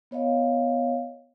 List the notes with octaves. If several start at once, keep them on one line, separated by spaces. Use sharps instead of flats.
B3 C#5 D#5 F5